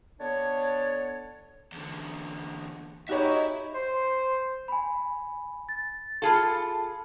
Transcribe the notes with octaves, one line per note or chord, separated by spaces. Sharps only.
D2 D3 B3 D4 C#5
E2 D3
D#4 F#4 G4 C#5 E5 B5
C5
G#5 B5
A6
F4 G#4 A4 F5 A5 B5